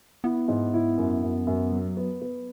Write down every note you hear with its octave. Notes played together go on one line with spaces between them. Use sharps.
B3 E4
G#2
E4
F#2
F#2
F#2
F#3
B3
B3